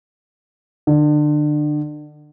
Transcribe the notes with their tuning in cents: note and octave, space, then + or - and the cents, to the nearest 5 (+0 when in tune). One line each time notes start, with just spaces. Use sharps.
D3 +30